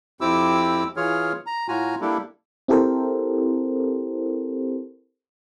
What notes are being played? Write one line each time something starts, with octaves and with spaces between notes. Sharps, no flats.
F2 C4 E4 G4 D6 E6
E3 F4 G#4 C#5 F6
A#5
A2 F4 F#4 G#5 A#5
G3 A#3 D4 E4 G4 A4
C4 E4 G4 A4 A#4 C5